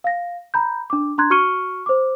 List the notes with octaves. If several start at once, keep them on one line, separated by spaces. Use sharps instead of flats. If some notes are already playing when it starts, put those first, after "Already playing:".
F5 A#6
A#5 B5 G6
D4 D6
D4 A#5 C6 F#6 G#6
F#4 C#6 F6 C#7 D#7 G7
C5 D6